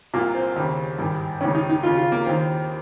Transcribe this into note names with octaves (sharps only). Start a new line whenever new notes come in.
C2 A#2 A#3
C4
D#2 C#3
G#1 G2 D#3
C#2 C3 D#3 C#4
D#4
D#4
D#2 C#3 F4
F4
A#3
D#2 D#3 C4